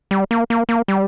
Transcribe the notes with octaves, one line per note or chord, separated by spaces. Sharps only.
G3
A#3
A#3
A#3
G3